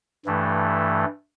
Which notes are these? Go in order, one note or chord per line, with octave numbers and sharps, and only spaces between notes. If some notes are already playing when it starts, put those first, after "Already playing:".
G2 E3 A3